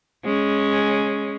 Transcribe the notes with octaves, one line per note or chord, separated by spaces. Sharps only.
G#3 C#4